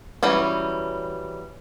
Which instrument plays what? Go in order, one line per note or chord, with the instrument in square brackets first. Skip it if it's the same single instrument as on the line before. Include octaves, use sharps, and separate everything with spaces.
[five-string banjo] E3 F#3 G3 C#4